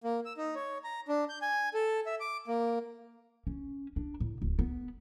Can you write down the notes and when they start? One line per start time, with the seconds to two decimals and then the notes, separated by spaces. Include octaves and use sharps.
0.04 A#3
0.25 E6
0.37 D#4
0.55 C#5
0.84 A#5
1.08 D4
1.29 G6
1.42 G#5
1.74 A4
2.06 E5
2.20 D6
2.48 A#3
3.47 C#4
3.96 D4
4.20 A2
4.42 D1
4.59 B3